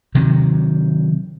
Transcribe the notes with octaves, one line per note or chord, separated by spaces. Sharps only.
C3 D#3 F#3